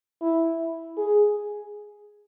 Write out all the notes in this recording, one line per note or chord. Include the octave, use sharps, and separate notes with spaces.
E4
G#4